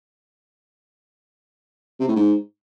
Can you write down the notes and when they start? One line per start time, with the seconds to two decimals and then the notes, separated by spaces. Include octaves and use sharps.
2.00 C3
2.08 A2
2.16 G#2